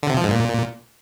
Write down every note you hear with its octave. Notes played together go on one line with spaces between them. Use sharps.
D3
C3
F3
G#2
A#2